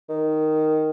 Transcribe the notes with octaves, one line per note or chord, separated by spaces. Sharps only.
D#3